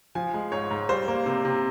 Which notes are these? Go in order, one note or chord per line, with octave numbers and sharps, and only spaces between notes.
F3 G#5
G#3
G#2 C#5
G#2
G3 C5
A#3
C3
C3